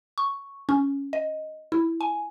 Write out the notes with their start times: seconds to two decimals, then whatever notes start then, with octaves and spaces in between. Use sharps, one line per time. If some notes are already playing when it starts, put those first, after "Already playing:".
0.18 C#6
0.69 C#4
1.13 D#5
1.72 E4
2.01 G#5